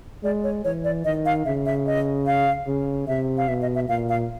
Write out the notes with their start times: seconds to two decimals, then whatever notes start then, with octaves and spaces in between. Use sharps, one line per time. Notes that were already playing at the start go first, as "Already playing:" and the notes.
0.23 G#3 D5
0.44 C#5
0.64 E3 C#5
0.84 D5
1.05 D#3 D#5
1.25 F5
1.45 C#3 E5
1.66 E5
1.86 D#5
2.26 F5
2.67 C#3
3.07 C3 E5
3.38 F5
3.48 B2 E5
3.62 D#5
3.75 E5
3.89 A#2 F5
4.09 F5